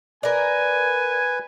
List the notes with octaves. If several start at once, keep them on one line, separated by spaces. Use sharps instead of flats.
A#4 B4 D5 G#5